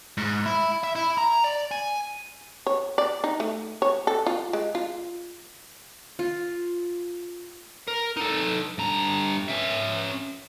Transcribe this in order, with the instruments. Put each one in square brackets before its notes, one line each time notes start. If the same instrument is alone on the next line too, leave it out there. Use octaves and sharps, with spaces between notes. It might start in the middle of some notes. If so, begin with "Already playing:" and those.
[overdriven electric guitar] G#2
E4
E5
E4
A#5
D5
G#5
[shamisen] C#5
D5
D#4
A3
C#5
A4
F4
G#3
F4
[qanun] F4
[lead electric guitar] A#4
D#4 A4
G2 A#5
C#4 E5